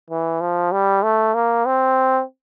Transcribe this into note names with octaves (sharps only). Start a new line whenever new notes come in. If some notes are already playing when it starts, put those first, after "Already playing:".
E3
F3
G3
A3
A#3
C4